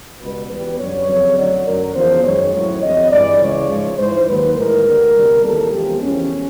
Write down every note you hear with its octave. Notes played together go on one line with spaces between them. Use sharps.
C#2 B2 G3 B4
E2 B2 G3 B4
F#2 D3 G3 C#5
F2 C#3 F#3
D2 D3 F#3 D5
F#2 D3 F#3 A#4
E2 C#3 F3 C5
F#2 D#3 G#3 C#5
A2 F#3
F2 D3 G3 D#5
G2 E3 G#3 D5
C#2 C#3 E3 C#5
G#2 F3 G#3
G#2 E3 G#3 C5
D#2 D#3 F#3 B4
A2 E3 G#3 A#4
D2 D3 G3
C2 B2 G3
D#2 C#3 E3 G3 A4
E2 C3 F3 G#3 G4
E2 C#3 F3 C#4